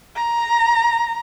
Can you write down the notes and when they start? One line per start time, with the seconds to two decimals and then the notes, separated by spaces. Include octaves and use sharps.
0.16 A#5